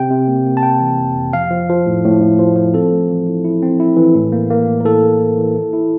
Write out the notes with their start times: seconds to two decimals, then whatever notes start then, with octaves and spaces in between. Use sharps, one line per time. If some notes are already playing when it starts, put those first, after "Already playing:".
Already playing: C3 G5
0.11 C3
0.28 A#3
0.46 A#3
0.57 A5
0.63 A#3 G5
0.81 E3
0.99 F2
1.16 F2
1.33 F3 F5
1.51 F3
1.69 F3
1.86 A2
2.04 A2
2.21 A2
2.39 F3
2.56 F3
2.74 C4 A4
2.92 A3
3.09 E3
3.27 E4
3.44 E4
3.63 C4
3.80 E4
3.97 E3
4.15 A2
4.32 A#3
4.50 A#3
4.67 A2
4.81 A#4
4.85 A2 A4
5.03 A2
5.20 A2
5.38 E3
5.55 E4
5.73 E4